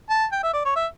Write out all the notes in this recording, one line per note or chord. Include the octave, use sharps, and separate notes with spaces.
A5
G5
E5
D5
C#5
E5